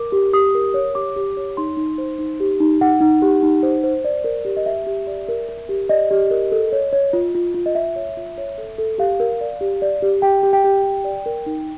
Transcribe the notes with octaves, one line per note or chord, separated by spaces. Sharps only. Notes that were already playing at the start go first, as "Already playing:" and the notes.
Already playing: A#4 D6
G4
G4 D#6
A#4
C#5
G4 D6
G4
C#5
D#4 C6
D#4
C5
D#4
G4
D#4
D#4 F#5
D#4
G4
D#4
C5
C5
D5
A#4
G4
D#5
G4 E5
G4
D5
A#4
A#4
G4
D5 D#5
G4
A#4
A4
C#5
C#5
F4
F4
F4
D#5
F4 E5
C#5
F4
C#5
A4
A4
G4 F5
A#4
D5
G4
D5
G4
G4 G5
G4
G5
G4
G4
D5
A#4
D#4